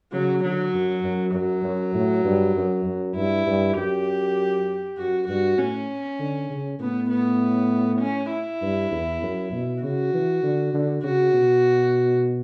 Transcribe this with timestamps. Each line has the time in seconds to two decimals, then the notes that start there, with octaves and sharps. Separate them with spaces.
0.12 C#3 F#3
0.43 D3 F#3
0.74 F#2
1.04 F#2
1.34 F#2 F#3
1.64 F#2
1.94 A2
2.24 G2
2.55 F#2
2.85 F#2
3.15 G2 E4
3.46 G2
3.76 F#2 G4
4.98 F#2 F#4
5.28 G2 F#4
5.58 A2 C#4
6.20 D3
6.50 C#3
6.80 A2 B3
7.10 B3
8.01 C#4
8.31 E4
8.62 G2
8.91 E2
9.23 F#2
9.52 B2
9.82 C#3 F#4
10.14 E3
10.43 D3
10.74 D3
11.04 C#3 F#4
11.34 B2